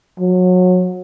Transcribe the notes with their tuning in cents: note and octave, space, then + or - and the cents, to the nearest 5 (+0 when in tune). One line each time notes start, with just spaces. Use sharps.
F#3 -25